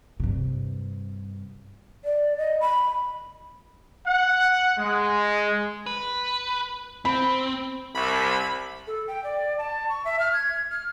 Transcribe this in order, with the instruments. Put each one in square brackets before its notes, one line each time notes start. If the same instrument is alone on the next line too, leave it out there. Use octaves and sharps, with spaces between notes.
[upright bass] G2 C3
[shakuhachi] D5
D#5
B5
[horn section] F#5
G#3
[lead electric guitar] B4
[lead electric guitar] C4 [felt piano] B5
[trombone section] C2 [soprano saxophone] B5
[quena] A4
G5
D5
A5
C#6
E5
F6
G#6
G#6
F6